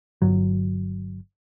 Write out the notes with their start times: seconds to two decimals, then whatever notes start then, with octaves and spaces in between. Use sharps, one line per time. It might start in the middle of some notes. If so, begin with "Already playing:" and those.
0.22 G1 F#3